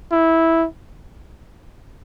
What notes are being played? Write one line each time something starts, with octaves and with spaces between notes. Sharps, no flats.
E4